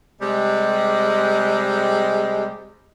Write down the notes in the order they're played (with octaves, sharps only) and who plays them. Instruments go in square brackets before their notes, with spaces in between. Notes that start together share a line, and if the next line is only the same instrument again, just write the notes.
[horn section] C3 G3 G#3